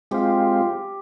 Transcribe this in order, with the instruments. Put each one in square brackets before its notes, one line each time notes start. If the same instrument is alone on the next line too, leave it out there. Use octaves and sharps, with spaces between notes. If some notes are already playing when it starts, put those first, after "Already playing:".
[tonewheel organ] G#3 C4 F4 [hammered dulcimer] G4